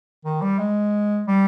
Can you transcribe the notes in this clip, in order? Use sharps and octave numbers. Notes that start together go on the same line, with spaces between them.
D#3
G3
G#3
G3